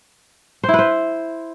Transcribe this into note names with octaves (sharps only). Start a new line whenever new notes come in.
C5
E4
B4
C5